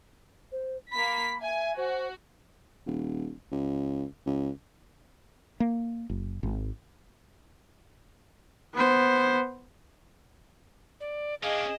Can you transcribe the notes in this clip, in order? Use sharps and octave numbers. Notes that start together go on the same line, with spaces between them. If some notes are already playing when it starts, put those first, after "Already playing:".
C5
A#3 B5 B6
E5 G#5
F#4 C5
D#1
C#2
C#2
A#3
F#1
G#1
B3 C5
D5
C#4 D4 G#4 D#5 F5